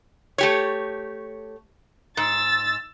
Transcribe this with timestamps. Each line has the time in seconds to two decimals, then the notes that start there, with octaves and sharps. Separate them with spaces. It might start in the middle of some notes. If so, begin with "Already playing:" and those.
0.38 A3 G4 C#5
2.17 G#2 E6 A6